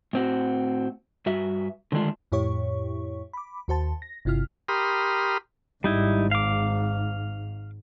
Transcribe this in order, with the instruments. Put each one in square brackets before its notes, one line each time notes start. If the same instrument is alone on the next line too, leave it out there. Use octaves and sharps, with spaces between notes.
[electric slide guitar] A2 C4 F#4
G2 F#4 E5
D3 D#3 G#3 A3 D4 F4
[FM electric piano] F2 A2 E4 G4 C#5 C#6
B5 D6
D#2 F#4 C5 A5
A#6
G1 C3 E4 F4 F6
[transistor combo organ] G4 A#4 B5 C6 D#6 F6
[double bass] G#1 G#2 [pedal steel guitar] G3 D#4 E4
[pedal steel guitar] F5 D6